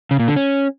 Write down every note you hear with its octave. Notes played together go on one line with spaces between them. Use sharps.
C#3
A#2
D3
C#4